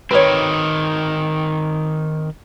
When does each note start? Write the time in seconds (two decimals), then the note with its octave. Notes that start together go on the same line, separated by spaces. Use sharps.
0.11 D#3 C4 B4 C#5